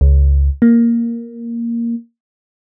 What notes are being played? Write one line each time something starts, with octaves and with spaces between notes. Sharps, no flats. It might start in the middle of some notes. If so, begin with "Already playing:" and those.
C#2
A#3